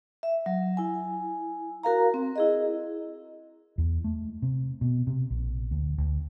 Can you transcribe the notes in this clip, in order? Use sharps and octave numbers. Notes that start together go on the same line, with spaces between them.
E5
F#3
E4 G#5
F#4 A#4 F5 A#5
C4
E4 G#4 D#5
E2
A3
C3
B2
C3
A#1
D2
D2